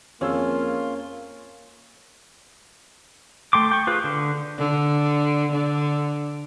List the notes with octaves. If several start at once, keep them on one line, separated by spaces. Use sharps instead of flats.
F2 A#3 C#4 F4 G#4 E6
A3 G5 C6 D6
G5 C#6
F4 G#4 B4 C5
D3
D3
D3